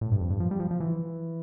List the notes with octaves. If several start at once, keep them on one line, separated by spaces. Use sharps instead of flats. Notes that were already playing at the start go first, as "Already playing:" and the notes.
A2
G2
F2
G2
F3
G3
F3
F3
E3